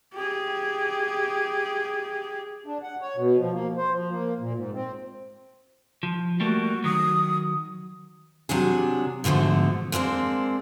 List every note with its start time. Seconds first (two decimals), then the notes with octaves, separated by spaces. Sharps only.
0.14 G4 G#4
2.66 D4
2.83 F#5
3.01 C#5
3.17 B2
3.38 F3
3.52 A#3
3.77 C5
3.93 F3
4.10 A#3
4.40 A#2
4.55 G#2
4.74 C4
6.03 F3
6.40 G3 A3 A#3 F#4
6.84 D#3 F#3 D#6
8.49 C3 F#3 D4 G#4
9.24 G#2 B2 D3 F3 A3
9.92 G#3 A#3 C4 D4